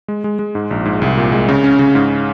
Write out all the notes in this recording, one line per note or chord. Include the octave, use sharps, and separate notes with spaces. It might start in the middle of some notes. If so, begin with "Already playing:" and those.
G#3
G#3
G#3
G#2
A#1
G#2
C2
A#2
G#3
C#3
C#4
C#3
G#2